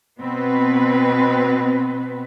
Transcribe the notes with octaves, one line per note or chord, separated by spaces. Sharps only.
B2 B3 C4 B4